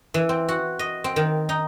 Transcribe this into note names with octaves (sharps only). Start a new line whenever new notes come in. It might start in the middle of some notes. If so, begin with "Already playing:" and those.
E3
C4
F#4
D#5
C4
D#3
D#4